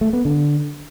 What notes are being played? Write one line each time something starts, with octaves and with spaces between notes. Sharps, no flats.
A3
B3
D3